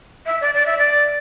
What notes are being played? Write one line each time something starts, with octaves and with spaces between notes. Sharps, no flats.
E5
D5
D5
E5
D5